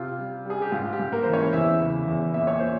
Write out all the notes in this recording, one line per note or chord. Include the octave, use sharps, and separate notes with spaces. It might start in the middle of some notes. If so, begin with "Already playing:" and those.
Already playing: C3 F4
G3
G3 G#4
G4
G#2 F4
G4
G#2
A#3 A#4
E3 C5
C#4 C#5
E2 E4 E5
C#3
E2
A#2 E5
C#5
A#2 C5